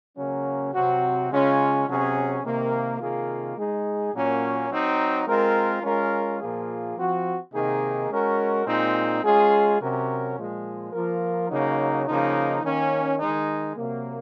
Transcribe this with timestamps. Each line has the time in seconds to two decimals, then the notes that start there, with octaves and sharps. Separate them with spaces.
0.16 C#3 F#3 A#3 C#4
0.73 C3 F#3 C4 F#4
1.29 C#3 G#3 C#4 F4
1.86 C3 F#3 C#4 G#4
2.43 C3 D#3 A#3
2.99 C3 D#3 A#3 F4 G#4
3.55 G#3 D#4 G#4
4.13 A#2 F#3 A#3 C#4
4.69 F#3 C4 D#4
5.26 G#3 C4 F4 A#4
5.82 G#3 C#4 F4 A#4
6.39 A#2 F3 A#3 F4 G#4
6.96 F3 C4 F#4
7.53 C3 D#3 A#3 D#4 G#4
8.09 G#3 C#4 F#4 A#4
8.65 A#2 G#3 C4 D#4
9.22 G#3 C#4 F4 G#4
9.79 C3 F#3 C#4 F#4 A#4
10.36 A#2 F3 G#3
10.92 F3 A#3 F4 A#4
11.49 C#3 F#3 A#3 D#4
12.06 C#3 F3 A#3 D#4
12.63 D#3 A#3 C#4
13.18 D#3 G#3 D#4
13.76 C3 F#3 A#3